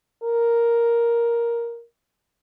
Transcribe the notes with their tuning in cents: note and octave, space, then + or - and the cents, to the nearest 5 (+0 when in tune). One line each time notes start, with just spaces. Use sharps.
A#4 +5